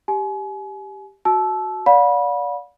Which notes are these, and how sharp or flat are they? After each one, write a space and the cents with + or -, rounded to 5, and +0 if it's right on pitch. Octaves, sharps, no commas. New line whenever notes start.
G4 +0 G#5 +35
F#4 +0 A5 -25 E6 +0
D5 -30 F5 +45 B5 -25